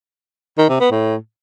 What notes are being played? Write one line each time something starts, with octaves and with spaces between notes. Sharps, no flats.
D#3
C3
B3
A2